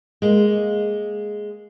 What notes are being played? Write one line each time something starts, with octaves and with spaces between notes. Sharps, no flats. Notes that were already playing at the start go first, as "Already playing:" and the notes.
G#3 A#3